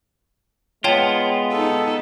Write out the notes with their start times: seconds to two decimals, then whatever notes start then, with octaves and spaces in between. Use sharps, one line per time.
0.84 G#3 B3 F4 C#5 G5 A5
1.53 D#4 A4